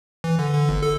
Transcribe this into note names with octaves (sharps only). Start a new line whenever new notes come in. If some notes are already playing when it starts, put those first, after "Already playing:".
E3
D3
D3
G1
A4